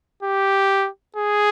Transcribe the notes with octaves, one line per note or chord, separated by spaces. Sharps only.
G4
G#4